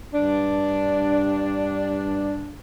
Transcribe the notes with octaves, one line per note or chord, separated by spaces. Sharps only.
G2 D4